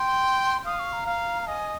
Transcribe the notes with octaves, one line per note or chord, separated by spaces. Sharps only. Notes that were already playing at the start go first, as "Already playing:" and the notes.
Already playing: G5 C6
F5 D#6
C#6
A#5
F5
A#5
D#5 G#5